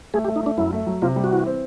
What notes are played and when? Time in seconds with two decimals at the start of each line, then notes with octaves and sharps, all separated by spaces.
0.14 A3 G#4
0.24 G4
0.28 A3
0.36 D#4
0.43 A3 D4
0.57 F#2 E4
0.73 A3
0.87 F#3
1.02 C3 F4
1.16 G3
1.24 F#4
1.31 E3
1.46 C4